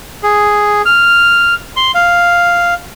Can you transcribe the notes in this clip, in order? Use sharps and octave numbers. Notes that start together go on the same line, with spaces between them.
G#4
F6
C6
F5